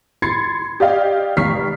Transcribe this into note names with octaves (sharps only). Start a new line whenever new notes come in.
B5 C6 G#6 A6 C7 C#7
G4 D5 D#5 F5 G5
F1 C#6 F6 B6 C7